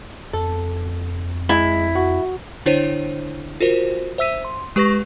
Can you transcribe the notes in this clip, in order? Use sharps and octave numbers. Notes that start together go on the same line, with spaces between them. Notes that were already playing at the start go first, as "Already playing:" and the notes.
F2 A4
G#3 E4
F#4
D3 D4 E4 C5 C#5 D#7
F4 F#4 A#4 C5
C5 E5 E6 B6 D#7
C6
G#3 G4 B4 C#6 A#6